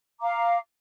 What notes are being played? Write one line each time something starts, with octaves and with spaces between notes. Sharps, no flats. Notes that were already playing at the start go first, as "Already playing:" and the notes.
F5 A#5 D6